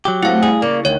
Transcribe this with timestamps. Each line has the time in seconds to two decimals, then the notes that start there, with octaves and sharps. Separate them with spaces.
0.05 F#3 G4
0.23 A3 C4 E4 F5 F#5
0.43 G3 G#4
0.62 C#3 A#3 D5
0.85 D2 D#3 C#5